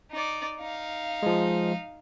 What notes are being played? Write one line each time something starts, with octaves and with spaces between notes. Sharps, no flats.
D#4 D5
D#4 F5
F3 G#3